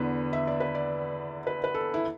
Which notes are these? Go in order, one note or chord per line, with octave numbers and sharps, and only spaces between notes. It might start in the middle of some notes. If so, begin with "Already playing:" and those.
Already playing: E2 D3 B3 B4
E5
D5
B4
D5
B4
B4
A4
E4